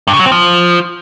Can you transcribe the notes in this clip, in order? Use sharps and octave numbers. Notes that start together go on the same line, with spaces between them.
G2
C#3
F#3
C4
F3